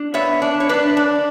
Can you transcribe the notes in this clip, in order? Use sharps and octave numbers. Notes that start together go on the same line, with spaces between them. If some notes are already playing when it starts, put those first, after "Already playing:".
Already playing: D4
B3 C#5 E5
D4
C#5
D4 B4 D5
D4